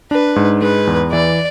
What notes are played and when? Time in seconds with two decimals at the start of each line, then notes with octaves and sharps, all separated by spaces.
0.11 D4 B4
0.36 G#2
0.62 G#3 B4
0.87 E2
1.12 E3 D5